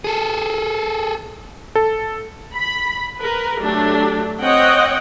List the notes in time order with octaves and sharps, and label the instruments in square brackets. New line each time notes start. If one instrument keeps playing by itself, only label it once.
[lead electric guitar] G#4 A4
[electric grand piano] A4
[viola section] B5
A#4 B4
F#3 A3 D4 G4
C4 C#5 D#5 F#5 G5